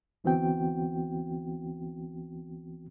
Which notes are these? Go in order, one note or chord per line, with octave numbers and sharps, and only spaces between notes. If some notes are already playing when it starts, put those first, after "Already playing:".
D2 E3 B3 C4 F#4 G5